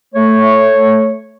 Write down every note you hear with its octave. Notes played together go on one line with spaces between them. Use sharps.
A3 C#5